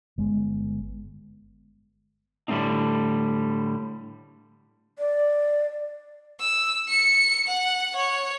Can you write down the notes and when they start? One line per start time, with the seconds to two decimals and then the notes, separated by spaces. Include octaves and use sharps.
0.18 G1 G#3 B3
2.48 A2 D3 G3 A3 C4 D#4
4.99 D5
6.40 E6
6.89 C#7
7.48 F#5
7.96 C#5